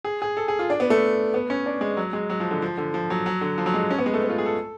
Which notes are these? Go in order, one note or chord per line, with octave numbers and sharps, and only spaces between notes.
G#4
G#4
A4
G#4
F4
D4
B3
A3
B3
C#4
D4
G#3
F#3
G#3
F#3
F3
D3
F3
D3
F3
F#3
F#3
D3
F3
F#3
G#3
C#4
B3
G#3
A3
B3
F4
G#4
A4